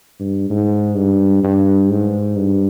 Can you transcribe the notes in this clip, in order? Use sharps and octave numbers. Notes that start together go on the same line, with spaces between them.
G2
G#2
G2
G2
G#2
G2